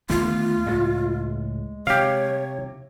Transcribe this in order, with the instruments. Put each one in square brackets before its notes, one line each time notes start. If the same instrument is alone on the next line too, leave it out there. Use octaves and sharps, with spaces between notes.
[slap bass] D#2 D3 B3 [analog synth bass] A3 [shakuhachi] F4
[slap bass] C#2 A2 [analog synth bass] G#3
[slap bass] C3 [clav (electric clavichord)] G4 F5 [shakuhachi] C#5